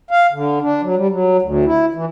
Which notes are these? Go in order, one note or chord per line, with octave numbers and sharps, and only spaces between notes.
F5
D3
D4
F#3
G3
F#3
D2
E4
E3